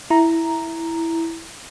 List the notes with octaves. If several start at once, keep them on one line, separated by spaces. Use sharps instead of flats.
E4 A#5